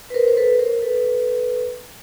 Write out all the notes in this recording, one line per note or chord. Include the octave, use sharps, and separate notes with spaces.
B4
A#4 C5
C5
A4 B4
A#4 C5
A4 B4